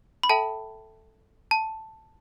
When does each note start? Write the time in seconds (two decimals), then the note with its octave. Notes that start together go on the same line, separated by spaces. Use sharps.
0.23 B5
0.29 A4 E5 G5 A5
1.51 A5